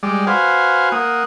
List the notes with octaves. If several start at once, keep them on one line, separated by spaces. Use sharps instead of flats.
G3 G#3 D5
F#4 B4 C5 F5 G#5
A#3 F#5 D#6